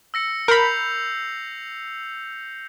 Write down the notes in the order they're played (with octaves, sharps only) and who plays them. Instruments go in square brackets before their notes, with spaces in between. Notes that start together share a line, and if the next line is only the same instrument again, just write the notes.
[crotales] E6 A#6 C#7
[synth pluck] A#4 B5 [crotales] G6 C7 F7